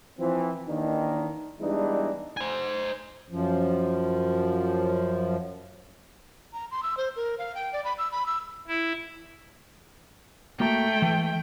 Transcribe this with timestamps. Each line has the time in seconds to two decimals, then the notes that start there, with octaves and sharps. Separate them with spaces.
0.19 E3 F3 C4
0.68 D#2 D#3 E3 A#3 D4 D#4
1.60 E2 E3 G3 G#3 D4 D#4
2.37 C5 G#5
3.28 F#2 F3
6.53 A#5
6.71 C6
6.83 E6
6.97 C5
7.16 A#4
7.39 F5
7.55 G5
7.73 D5
7.84 B5
7.99 E6
8.12 B5
8.26 E6
8.67 E4
10.60 A3 A#3 F#4 G5 A#5
11.02 E3